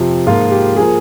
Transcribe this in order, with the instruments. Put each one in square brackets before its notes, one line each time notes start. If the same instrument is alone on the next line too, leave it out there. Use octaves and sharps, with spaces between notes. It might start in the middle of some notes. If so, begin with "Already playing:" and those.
Already playing: [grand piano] F2 C3 F3
G#2 F3 A#3 F4
G4
F3 A#3 G#4